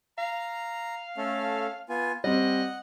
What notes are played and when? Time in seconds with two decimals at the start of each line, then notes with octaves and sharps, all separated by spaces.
0.18 F5 A#5
1.18 A3 C#4 A4
1.89 B3 F4 G#5
2.24 G3 C4 D#5 F#5